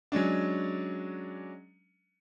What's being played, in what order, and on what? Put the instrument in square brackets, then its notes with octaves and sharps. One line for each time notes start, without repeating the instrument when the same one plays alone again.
[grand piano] F#3 G#3 C#4 D4